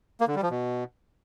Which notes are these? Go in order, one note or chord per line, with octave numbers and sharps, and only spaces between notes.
A#3
D3
G3
F3
B2